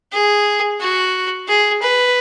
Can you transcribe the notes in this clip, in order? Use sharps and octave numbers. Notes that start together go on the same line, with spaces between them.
G#4
F#4
G#4
B4